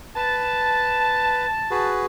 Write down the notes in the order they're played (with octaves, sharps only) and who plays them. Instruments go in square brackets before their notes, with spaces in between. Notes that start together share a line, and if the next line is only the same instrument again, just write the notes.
[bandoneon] B4 [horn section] A5
[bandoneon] F#4 G#4 B4